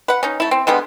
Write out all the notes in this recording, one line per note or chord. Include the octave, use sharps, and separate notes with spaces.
B4 F#5
C#4 D#4
A3 E4
C4
D3 G3 G#3 B3